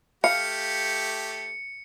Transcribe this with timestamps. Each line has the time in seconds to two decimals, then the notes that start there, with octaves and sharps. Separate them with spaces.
0.24 A3 G4 F5 C#7